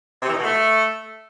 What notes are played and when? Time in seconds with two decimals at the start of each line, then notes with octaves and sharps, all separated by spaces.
0.22 C3
0.28 E3
0.33 D#4
0.38 B2
0.43 A3